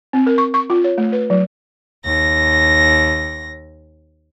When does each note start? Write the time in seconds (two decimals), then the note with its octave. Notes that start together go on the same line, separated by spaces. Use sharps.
0.13 C4
0.27 A#4
0.38 C#6
0.54 C#6
0.70 F4
0.84 C#5
0.98 A3
1.12 B4
1.30 F#3
2.05 D#2 A#6